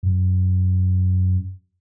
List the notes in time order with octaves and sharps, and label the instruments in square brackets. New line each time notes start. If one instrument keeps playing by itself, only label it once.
[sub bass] F#2